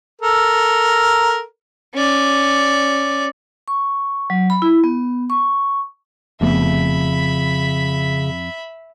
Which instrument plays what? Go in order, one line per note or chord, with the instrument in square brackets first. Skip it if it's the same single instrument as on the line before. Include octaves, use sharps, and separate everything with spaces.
[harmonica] A4 A#4
[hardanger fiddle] C#4 D5
[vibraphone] C#6
F#3
B5
E4
B3
C#6
[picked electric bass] F1 A3 B3 [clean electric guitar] F2 [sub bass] C#3 [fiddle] E5 B5